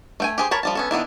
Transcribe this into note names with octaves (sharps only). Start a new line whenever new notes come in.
A3 G5 G#5
G4 G#4 C5
A#4 C#5 A5 B5
F3 G3 A5
B3 C#4 A4
D#3 B3 D4 E4